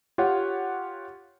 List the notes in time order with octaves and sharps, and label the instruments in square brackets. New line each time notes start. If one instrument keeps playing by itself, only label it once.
[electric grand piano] F4 G4 C#5 F#5